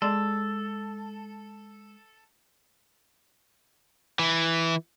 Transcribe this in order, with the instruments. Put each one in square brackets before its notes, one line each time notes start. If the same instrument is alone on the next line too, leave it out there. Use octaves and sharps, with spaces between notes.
[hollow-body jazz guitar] G#3 D5 C6 [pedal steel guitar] A4
[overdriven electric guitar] E3